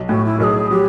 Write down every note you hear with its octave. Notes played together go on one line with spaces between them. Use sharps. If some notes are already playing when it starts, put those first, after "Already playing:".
Already playing: B1
A2 F#4
E4
B1 G#4 A#4
F#3 G4